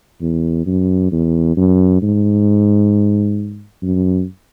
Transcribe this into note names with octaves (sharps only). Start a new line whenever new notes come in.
E2
F#2
E2
F#2
G#2
F#2